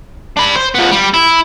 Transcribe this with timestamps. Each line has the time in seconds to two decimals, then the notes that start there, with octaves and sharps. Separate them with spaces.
0.37 D4 B5
0.56 C5
0.75 F3 B3
0.91 G3
1.14 E4